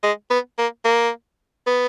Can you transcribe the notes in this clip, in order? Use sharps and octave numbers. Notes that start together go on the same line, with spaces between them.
G#3
B3
A#3
A#3
B3